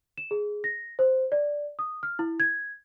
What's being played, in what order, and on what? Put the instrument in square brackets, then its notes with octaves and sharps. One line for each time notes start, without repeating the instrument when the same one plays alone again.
[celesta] E7
G#4
A#6
C5
D5
D#6
F6
E4
G#6